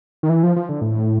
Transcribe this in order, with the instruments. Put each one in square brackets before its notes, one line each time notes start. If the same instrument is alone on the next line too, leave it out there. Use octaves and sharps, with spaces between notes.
[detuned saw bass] D#3
E3
F3
F3
D3
A2